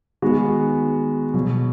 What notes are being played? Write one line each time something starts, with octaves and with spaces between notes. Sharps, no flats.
D#3 G#3 B3 F#4
B2 F#3 B3